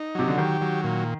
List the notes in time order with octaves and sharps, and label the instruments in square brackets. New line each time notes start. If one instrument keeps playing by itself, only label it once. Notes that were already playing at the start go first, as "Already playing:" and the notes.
Already playing: [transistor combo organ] D#4
[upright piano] C3 [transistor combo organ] F#3
[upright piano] D3
[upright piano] D#3 [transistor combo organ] G4
[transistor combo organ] F#3
A#2